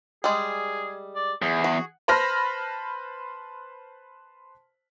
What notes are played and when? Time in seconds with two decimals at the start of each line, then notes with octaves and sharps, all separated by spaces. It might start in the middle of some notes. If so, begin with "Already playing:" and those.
0.24 G3 G#3 G#4
1.15 D5
1.42 E2 G#4
1.64 F#4
2.08 B4 C5 A5 B5 F6 A#6